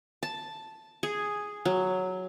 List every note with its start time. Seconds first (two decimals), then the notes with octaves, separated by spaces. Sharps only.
0.23 A5
1.03 G#4
1.65 F#3